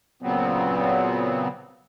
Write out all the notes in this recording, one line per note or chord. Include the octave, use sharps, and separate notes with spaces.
A#2 C#3 F#3 B3 C4